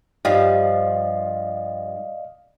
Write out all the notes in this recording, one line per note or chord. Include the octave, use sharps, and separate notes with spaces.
G2 F3 G4 D5 D#5 F5